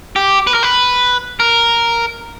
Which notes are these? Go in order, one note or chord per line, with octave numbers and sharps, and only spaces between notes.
G4
B4
A#4
B4
A#4